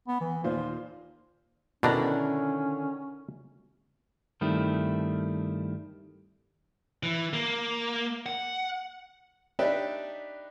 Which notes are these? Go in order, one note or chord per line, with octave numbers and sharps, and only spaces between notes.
B3
E3
D#2 A#2 F4 C5
B2 D3 D#3 C#4 D4 E4 A#5
G2 D#3 G3 A3 C4 E4
E3
A#3
F#5
D4 D#4 G4 B4 D5 E5